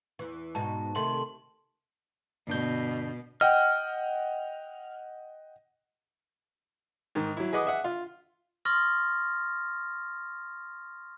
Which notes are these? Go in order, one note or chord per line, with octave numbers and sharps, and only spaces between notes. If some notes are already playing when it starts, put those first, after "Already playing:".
E2 E3
G#2 B2 D#4 A5
C3 D#3 A3 C6 F#7
G1 B2 D4 G6
D#5 F#5 G5 F6
G#2 D#3
F#3 E4
G#4 B4 D#5 F#5 D6 D#6
G#4 E5 F#5
F4
C6 C#6 D#6 F6 A6 A#6